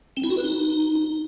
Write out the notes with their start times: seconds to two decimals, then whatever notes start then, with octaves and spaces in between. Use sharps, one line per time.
0.17 C4
0.24 E4
0.30 F#4
0.37 B4
0.44 D#4